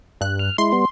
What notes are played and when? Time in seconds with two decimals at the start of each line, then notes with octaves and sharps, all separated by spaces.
0.21 G2 F#6
0.39 F6
0.58 G#3 E4 C6
0.72 G3 B3